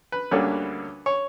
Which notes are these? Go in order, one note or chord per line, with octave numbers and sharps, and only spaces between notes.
B4
D2 D3 G3 A#3 C#4
C#5